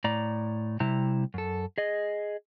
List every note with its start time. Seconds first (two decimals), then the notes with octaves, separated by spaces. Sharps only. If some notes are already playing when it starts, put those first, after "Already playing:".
0.04 A2 D5 A#5
0.80 C3 G3 E4 A#5
1.34 F#2 A4
1.78 G#4 D#5